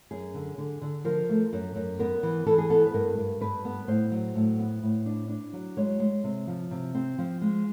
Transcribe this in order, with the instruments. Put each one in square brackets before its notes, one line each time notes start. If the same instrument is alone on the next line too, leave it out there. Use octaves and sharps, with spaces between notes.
[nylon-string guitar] F#2 G#4
D3
D3
D3
F3 A#4
A3
F#2
F#2
B3 A#4
E3
E3 A4
G#4
B3 A4
B4
G2 A#4
G2
G2 B4
B3
A2 C5
F#3
A2
B3
A2
D4
D4
F#3
G#3 C#5
G#3
C3
F3
C3
C4
F3
G#3